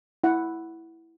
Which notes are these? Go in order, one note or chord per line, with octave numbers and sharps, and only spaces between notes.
E4 F#5